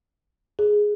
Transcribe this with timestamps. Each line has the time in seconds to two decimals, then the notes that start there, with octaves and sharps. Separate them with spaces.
0.59 G#4